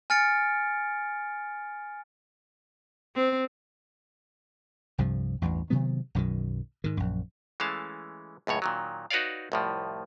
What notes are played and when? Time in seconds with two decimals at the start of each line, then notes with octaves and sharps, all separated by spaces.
0.10 G#5 F6 A6 C#7 D7
3.16 C4
4.98 C2 G2 C3 F3
5.42 A1 E2 G2
5.70 C3 D#3 F#3 B3
6.15 B1 F#2 B2 D#3
6.84 G#2 D#3
6.97 A#1 F#2
7.60 E3 G#3 A3 C#4 F5 A5
8.47 C#2 F#2 A2 C#5
8.62 A#2 D#3 F#3
9.10 D#4 F#4 B4 C#5 D5 F5
9.52 C2 A2 F3